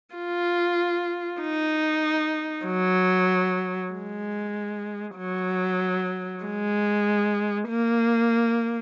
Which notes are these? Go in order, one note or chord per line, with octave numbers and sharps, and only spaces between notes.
F4
D#4
F#3
G#3
F#3
G#3
A#3